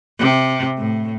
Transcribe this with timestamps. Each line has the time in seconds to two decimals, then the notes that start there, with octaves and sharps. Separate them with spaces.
0.20 C3
0.78 A2